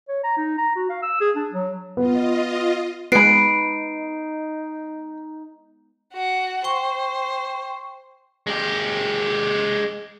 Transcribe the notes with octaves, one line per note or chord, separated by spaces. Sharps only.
C#5
A#5
D#4
A#5
F#4
F5
E6
G#4
D4
F#3
B3 F4 D#5
G#3 B3 D#4 B4 B5 C7 D7
F#4 F#5
C5 G5 C#6
G#3 G4